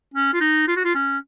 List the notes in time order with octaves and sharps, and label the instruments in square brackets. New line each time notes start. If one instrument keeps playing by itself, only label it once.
[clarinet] C#4
F4
D#4
F4
F#4
F4
C#4